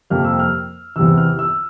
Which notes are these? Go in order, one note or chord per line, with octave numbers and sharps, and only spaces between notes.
F2 C3 G3 A#3 F6
E6
F6
E2 C3 E3 E6
F6
E6